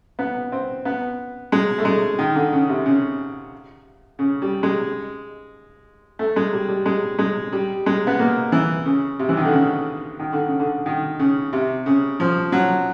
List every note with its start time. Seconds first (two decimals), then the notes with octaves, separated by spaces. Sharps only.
0.19 B3
0.52 C4
0.85 B3
1.52 G#3
1.78 A3
1.85 G#3
2.19 D#3
2.36 D3
2.53 C#3
2.69 C3
2.86 C#3
4.19 C#3
4.42 G3
4.63 G#3
6.19 A3
6.36 G#3
6.53 G3
6.69 G3
6.86 G#3
7.19 G#3
7.52 G3
7.86 G#3
8.07 B3
8.19 A#3
8.52 E3
8.85 C#3
9.19 C3
9.29 E3
9.37 D#3
9.45 D3
9.52 C#3
10.19 D#3
10.33 D3
10.46 C#3
10.60 D3
10.86 D#3
11.19 C#3
11.53 C3
11.86 C#3
12.20 F3
12.52 F#3